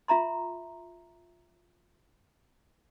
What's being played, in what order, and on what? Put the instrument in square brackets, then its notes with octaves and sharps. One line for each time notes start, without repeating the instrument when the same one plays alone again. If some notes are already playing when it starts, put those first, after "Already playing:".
[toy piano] F4 E5 A#5 C6